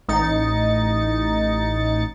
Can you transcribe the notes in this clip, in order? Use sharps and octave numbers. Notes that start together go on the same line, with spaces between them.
A1 D#4 A6 C#7